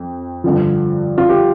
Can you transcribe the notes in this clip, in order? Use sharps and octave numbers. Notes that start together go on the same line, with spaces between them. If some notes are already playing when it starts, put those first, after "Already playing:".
Already playing: F2
G2 D3 F3
F4
G4